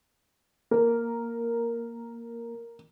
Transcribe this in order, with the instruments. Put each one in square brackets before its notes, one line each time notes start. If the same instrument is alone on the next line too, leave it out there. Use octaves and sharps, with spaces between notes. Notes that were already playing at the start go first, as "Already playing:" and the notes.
[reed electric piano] A#3 [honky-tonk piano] A#4